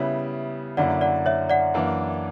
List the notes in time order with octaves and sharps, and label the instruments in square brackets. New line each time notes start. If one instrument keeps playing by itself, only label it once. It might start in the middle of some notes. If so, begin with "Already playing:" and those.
Already playing: [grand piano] C#3 G3 B3 E4 [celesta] C#5 E5
[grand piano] F#2 D3 A#3 C#4 E4 [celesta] D5 F#5
[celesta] D5 F#5
C#5 E5
D5 F#5
[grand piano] F#2 E3 A#3 D4